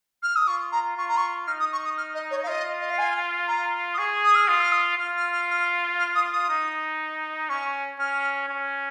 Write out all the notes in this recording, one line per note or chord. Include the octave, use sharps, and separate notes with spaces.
F6
D#6
F4 C#6
A#5
F4 C#6
A#5
C#6
D#4 F6
D#6
C#6
D#6
F6
D#5
C#5
F5
F4 D#5
D#5
F5
G#5
A#5
D#6
G#4 C#6
D#6
F6
F4 D#6
F6
D#6
F4 F6
F6
F6
F6
F6
D#6
D#6
D#4
C#4 C#6
C#4 F6
C#4